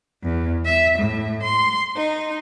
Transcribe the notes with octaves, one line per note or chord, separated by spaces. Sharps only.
E2
E5
A2
C6
D#4